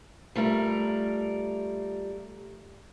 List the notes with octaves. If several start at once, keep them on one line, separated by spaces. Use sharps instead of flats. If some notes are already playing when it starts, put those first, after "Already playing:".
G3 A3 F4 A#4